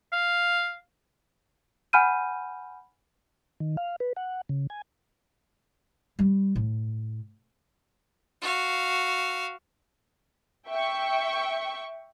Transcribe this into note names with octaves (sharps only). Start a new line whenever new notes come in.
F5
F#5 G#5 B5 F6 G6 D#7
D#3
F5
B4
F#5
C#3
G#5
G3
A2
F#4 F5
E5 G5 C#6